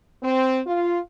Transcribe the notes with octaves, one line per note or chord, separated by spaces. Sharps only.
C4
F4